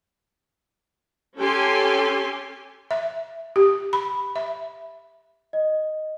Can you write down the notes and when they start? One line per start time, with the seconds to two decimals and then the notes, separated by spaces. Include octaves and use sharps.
1.38 C#4 G4 A4 G#5 C6
2.91 E5
3.56 G4
3.93 B5
4.36 E5
5.53 D#5